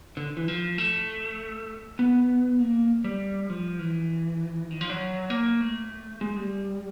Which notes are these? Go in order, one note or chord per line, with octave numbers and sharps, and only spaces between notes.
D3
E3
F3
A3
B3
A#3
G3
F3
E3
D#3
F3
F#3
A#3
A3
G#3
G3